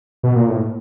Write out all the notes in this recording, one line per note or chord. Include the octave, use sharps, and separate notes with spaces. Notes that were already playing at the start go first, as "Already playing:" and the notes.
B2
A#2
A2